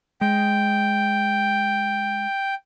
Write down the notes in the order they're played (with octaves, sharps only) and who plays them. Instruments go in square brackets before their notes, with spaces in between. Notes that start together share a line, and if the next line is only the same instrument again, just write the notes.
[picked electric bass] G#3 [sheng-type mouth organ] G5